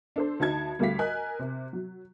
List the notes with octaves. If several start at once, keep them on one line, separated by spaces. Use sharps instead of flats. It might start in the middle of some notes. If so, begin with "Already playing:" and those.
D4 A4 C5
D2 D#4 A5 G#6
D2 G3 A3 G4 F5 B6
A#4 D#5 G#5 F#6
C3
F#3